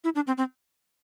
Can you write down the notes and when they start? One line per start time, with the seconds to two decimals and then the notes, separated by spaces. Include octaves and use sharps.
0.04 E4
0.15 D4
0.27 C4
0.38 C4